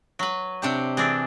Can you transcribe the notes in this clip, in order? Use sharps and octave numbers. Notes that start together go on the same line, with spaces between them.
F#3 B4
C3 D4 G4
E3 C4 D4 G#4